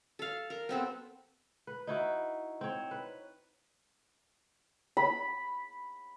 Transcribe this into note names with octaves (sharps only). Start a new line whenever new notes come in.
A4 F5
A#4
B3 C4 A4
B4
D#4 E4 F#4
C4 C#5
B4
B5